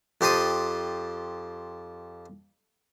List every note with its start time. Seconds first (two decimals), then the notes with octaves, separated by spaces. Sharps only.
0.21 F2 G4 C5 A5 D#6